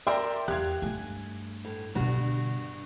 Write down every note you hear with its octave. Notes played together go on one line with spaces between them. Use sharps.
A#4 D5 E5 G5 C6
E2 G4 F5 F#6 G#6
G2 A3 G#5
A2
G2 B2 D3 F#4